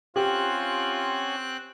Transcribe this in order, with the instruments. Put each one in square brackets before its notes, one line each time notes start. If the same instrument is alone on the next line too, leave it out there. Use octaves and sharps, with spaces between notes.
[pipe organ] C4 F#6 [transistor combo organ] C#4 F#5 G#5 [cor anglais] F4 [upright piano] G4